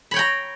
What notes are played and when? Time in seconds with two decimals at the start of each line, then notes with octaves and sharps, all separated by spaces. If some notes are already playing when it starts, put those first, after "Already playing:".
0.11 B5
0.14 C#5
0.16 G5
0.19 A#5